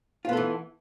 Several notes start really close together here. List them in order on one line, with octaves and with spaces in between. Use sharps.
F4 B3 A4 E3